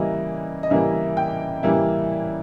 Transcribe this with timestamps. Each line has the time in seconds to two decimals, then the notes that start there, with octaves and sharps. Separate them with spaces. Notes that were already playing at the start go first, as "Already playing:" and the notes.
Already playing: C#3 E3 G3 A#3 E4 D#5
0.63 D#5
0.70 C#3 E3 G3 A#3 E4 E5
1.17 G5
1.63 C#3 E3 G3 A#3 E4